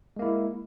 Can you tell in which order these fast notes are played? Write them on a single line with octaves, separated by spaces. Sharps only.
G#3 A#3 E4